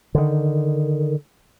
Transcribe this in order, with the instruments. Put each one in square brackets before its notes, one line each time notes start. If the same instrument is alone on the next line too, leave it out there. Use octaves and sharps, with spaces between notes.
[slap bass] D3 D#3